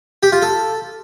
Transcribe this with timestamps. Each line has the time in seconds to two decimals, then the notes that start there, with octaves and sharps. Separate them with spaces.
0.23 G4
0.32 F4
0.42 A4